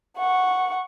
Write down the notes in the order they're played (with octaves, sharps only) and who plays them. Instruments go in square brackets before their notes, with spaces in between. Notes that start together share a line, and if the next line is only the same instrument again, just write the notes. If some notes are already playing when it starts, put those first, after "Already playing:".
[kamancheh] F#5 C#6